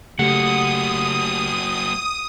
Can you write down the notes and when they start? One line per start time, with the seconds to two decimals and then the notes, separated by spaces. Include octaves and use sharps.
0.19 C#3 F#3 A3 A#3 G4 F#5 D#6